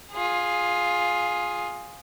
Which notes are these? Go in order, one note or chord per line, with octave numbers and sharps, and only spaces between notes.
F4 G#4